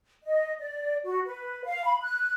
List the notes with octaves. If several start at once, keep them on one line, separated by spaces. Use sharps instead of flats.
D#5
D5
F#4
B4
F5
B5
F#6